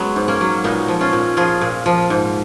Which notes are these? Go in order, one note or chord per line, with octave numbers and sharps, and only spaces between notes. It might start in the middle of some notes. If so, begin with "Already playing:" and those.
Already playing: F#3 G#3 B3 C#4
G#2
A#3 C#4
F#3
A#2 B3 D#4
F3
C#4 F4
A#2
F3 F4 G#4
A#2
F3
G#2